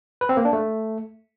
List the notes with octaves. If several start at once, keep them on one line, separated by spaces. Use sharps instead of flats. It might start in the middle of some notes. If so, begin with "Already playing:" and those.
B4
C4
A#3
D4
A3